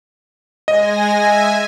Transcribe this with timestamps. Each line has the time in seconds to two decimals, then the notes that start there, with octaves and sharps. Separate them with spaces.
0.68 G#3 D#5 G#5 A#6
1.15 E5 G#5